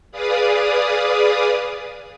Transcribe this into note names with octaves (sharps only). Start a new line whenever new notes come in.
G#4 B4 D5 F5 D#6